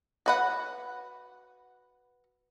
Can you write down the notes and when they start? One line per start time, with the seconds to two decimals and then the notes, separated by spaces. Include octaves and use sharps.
0.26 F#4 B4 F#5